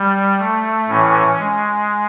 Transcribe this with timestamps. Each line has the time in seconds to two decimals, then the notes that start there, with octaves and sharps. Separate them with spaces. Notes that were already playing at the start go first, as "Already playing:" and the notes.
Already playing: G3
0.38 A3
0.88 A2 E3 C#4
1.39 G#3